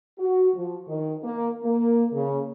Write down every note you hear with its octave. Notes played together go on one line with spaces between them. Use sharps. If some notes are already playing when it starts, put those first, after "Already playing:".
F#4
F3
D#3
A#3
A#3
C#3